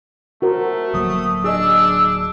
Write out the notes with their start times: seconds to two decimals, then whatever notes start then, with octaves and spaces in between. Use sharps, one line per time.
0.42 A3 F#4 A#4 C5
0.94 D1 F#3 A#3 D#6
1.44 D4 G#4 D#5 E6